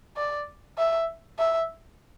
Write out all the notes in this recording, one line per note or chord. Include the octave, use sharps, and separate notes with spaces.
D5
E5
E5